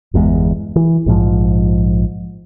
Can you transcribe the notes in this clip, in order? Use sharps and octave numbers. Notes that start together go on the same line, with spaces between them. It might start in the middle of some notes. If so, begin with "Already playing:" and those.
G1 E2 A#2 G#3
E3
A#1 G#2 C3 F3